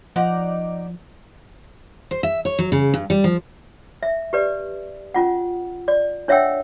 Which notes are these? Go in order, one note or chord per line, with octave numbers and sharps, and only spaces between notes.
F3 D#4 D5 F#5
C5
E5
C#5
F#3
C#3
G2
G3
F3
E5
G4 B4 D5
C#4 F4 F#5
D5
D4 C#5 E5 F#5 G5 E6